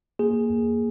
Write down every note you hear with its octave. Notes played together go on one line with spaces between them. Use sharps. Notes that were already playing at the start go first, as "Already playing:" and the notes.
A#3 G#4
F2